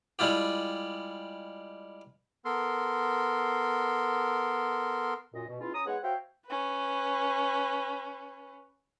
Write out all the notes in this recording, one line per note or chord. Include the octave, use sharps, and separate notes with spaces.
G3 G#3 E4 F4 G4
B3 A4 A#4 C6
F#2 A#2 D#5
B2
G#3 B3 C#4 E4 F4
C#4 A#5 D#6
G#3 B3 D#4 G#4 C#5 F#5
F#4 C5 C#5 E5 F5 G5
C#4 B4